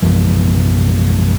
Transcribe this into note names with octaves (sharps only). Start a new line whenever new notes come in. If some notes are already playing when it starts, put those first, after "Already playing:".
A#1 F#2 E3 F3